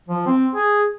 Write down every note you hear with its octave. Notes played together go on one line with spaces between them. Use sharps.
F3
C4
G#4